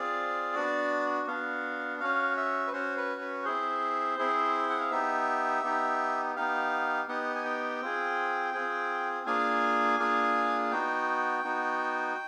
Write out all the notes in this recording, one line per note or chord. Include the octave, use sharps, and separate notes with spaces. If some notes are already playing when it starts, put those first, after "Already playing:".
Already playing: C4 F4 G#4 D5
B3 D4 F#4
B3 D4 F#4 F5
C#4 F#4 F5
E5
B4
C#4 F#4 C5
B4
B4
C4 E4 G#4 C5
C4 E4 G#4
F#5
F5
B3 D#4 G4 E5
B3 D#4 G4
B3 D#4 G4 F5
B3 D#4 G4 F#5
G#5
G5
C4 F4 G#4
C4 F4 G#4
A#3 D4 F4 G#4 G#5
A#3 D4 F4 G#4
B3 D#4 F#4 G5
B3 D#4 F#4